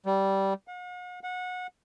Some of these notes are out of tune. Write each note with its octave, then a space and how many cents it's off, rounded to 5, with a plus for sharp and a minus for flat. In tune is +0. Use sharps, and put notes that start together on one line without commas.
G3 -10
F#5 -45
F#5 -25